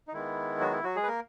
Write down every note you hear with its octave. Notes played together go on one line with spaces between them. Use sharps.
D#4
D#3 G#3 B3 E4
F#3 F#4
E4
F#3 F#4
G#3 G#4
B4
A#3 A#4